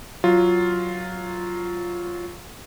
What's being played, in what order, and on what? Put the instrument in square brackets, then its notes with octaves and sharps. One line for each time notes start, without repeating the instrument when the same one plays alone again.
[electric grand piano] F#3 F4